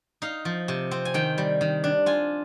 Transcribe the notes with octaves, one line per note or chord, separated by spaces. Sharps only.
D#4 F5
F3
C3
C4
G#5
D#3 G5
G3
D#3
D4
F4 G#5